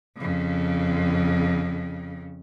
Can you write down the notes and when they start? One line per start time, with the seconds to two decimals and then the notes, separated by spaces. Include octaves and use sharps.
0.18 F2 C#3